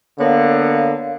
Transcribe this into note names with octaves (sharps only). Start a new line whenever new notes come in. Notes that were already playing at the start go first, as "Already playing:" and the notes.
D3 A#3 B3 C#5 F5